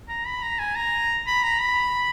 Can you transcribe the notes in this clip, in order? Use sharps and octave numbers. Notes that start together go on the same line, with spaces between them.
A#5
B5
A#5
G#5
A#5
B5
A#5
B5